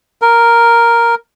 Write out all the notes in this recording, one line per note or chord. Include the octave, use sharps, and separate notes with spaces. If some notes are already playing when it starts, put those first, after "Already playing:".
A#4